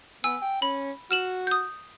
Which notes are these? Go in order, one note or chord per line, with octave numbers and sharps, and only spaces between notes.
B3 G#5 E6
G5
C#4 B5
F#4 F6 E7 F#7
D#6 G6